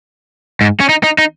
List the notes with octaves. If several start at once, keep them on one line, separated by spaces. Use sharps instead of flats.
G#2
C#4
D#4
D#4
D#4